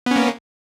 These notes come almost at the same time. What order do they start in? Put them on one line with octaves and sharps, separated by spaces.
B3 C#4 A#3